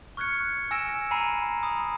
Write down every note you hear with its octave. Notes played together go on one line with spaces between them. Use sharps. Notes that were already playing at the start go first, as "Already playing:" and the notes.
C#6 F6 F#6 G#6 C#7
G#5 E6 A#6 D7 E7
G#5 A#5 B5 C7 D#7
A#5 B5 D#6